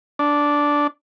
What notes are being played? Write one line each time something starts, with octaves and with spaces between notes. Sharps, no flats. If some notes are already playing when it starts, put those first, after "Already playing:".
D4